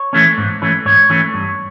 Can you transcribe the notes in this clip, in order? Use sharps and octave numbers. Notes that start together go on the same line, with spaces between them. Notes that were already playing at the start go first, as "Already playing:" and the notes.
Already playing: C#5
E3 A3 C#4
G#2
E3 A3 C#4
G#2 C#5
E3 A3 C#4
G2